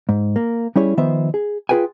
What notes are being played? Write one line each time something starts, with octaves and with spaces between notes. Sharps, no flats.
G#2
A#3
G3 C#4 E4 G#4 C#5
D#3 F3 B3 C5 E5
G#4
F4 G#4 B4 G5 G#5